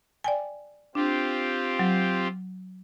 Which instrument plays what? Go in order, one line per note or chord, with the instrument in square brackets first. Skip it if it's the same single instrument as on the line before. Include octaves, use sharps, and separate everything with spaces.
[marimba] D5 G5 G#5
[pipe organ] C4 F4 G4 [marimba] D4
[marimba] F#3